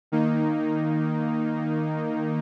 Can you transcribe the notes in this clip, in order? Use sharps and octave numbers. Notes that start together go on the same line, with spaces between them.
D#3 A#3 D#4